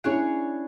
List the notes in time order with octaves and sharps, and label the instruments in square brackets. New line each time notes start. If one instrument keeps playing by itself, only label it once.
[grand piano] C#4 E4 [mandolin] D4 G#4 C#5